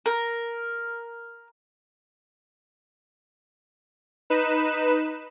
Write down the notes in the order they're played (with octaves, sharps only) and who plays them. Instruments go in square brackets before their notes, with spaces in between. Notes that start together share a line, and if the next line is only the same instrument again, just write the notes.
[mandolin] A#4
[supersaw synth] D#4 B4 E7